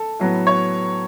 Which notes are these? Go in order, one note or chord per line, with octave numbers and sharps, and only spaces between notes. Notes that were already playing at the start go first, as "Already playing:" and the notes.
Already playing: A4
A2 F#3 B3
C#5